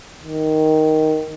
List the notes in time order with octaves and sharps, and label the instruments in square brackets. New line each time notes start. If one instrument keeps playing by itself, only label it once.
[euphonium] D#3